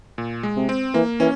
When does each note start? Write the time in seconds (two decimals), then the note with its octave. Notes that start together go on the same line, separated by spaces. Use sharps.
0.18 A#2
0.43 G#3
0.56 C3
0.69 C4
0.94 E3 A#3
1.20 E3 C#4